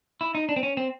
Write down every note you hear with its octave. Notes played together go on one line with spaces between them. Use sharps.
E4
D#4
D4
C4
C#4
C4